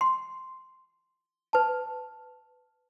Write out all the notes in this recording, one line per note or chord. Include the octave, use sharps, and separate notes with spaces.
C6
B4 A5